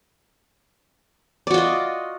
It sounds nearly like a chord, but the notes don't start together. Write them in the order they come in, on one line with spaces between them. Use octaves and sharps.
D5 F#4 F4 D#5